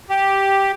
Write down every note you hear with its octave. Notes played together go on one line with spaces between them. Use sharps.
G4